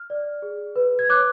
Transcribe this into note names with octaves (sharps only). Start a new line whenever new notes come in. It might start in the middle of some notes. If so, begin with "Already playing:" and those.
Already playing: F6
D5
G#4
B4
G#6
C#5 D6 F#6